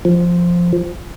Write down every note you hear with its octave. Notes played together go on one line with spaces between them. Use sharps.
F3